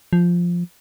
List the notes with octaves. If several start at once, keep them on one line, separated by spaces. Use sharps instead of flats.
F3